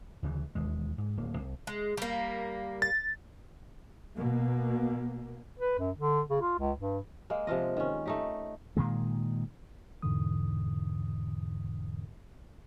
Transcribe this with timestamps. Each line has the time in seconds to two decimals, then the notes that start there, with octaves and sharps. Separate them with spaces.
0.23 D2 C#3 E3
0.55 E1 D#2 G#3
0.98 G#2
1.17 D1 D2 A#3
1.37 C2
1.67 G#3
1.97 G3 A#3
2.82 A6
4.16 B2 A#3
5.59 B4
5.79 F#2
5.97 D3
6.30 C#3
6.42 F4
6.59 C#2
6.79 G2
7.30 G#3 A#3
7.47 C3 F3 F4 D#5
7.77 D#3 C#4
8.06 A3 D#4 G4
8.77 A#2 D#3 G#3
10.02 E2 G#2 B2 D3 E3 D#6